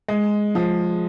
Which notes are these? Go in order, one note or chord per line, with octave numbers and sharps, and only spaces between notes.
G#3
F3